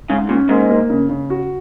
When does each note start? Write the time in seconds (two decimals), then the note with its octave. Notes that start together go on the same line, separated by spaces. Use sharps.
0.09 G#2 C#3
0.29 A#2 C#4
0.49 G#2 A#3
0.70 A#3
0.90 C#3
1.09 C#3
1.30 F#4